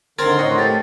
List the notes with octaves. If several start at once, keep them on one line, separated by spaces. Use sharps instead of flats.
D3 D#3 C4 A#4 C6 F6 G#6 A6
A2 C#5 D#5 F#5
A3 G4 A6